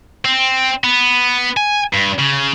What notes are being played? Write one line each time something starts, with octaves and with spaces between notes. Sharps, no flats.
C4
B3
G#5
G2
C#3